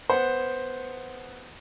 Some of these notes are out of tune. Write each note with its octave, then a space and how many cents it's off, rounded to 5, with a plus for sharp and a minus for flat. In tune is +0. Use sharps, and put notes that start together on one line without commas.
B3 +0 C5 +0 F#5 +0